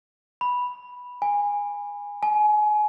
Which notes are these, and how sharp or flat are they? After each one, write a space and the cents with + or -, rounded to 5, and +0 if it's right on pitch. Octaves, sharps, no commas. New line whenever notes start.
B5 -5
G#5 -20
G#5 +30